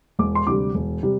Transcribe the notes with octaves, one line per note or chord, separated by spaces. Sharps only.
E1 D6
C6
D2 C3 G3 D6
E1
C3 G3